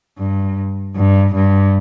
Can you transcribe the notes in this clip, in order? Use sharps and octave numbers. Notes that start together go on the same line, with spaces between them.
G2
G2
G2